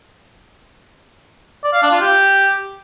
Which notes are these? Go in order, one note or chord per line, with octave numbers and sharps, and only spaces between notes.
D5
F5
D4
F4
G4